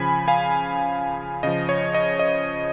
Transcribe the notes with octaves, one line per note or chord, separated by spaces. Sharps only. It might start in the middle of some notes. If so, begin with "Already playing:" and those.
Already playing: C#3 F3 G#5 B5
F5 G#5
C#3 F3 D#5
C#5
D#5
D#5